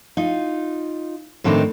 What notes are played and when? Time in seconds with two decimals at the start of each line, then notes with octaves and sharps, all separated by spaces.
0.17 D#4 F4
1.44 A2 D#3 A#3 C4 D4 D#4